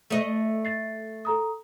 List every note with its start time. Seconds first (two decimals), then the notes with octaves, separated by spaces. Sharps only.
0.10 A3 D#5
0.65 A6 C7
1.25 A4 A#5 D#6